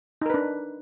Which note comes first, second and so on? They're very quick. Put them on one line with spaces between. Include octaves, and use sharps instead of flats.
D#4 A#4 B4 D4